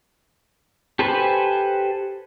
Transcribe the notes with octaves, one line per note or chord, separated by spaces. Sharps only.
G4 A4 B4 C5 G#5